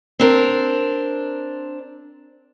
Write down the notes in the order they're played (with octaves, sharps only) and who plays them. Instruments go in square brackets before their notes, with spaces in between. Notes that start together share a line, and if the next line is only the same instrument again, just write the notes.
[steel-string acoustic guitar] C4 D4 A#4